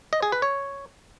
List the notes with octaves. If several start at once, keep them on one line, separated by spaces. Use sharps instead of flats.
D#5
G#4
B4
C#5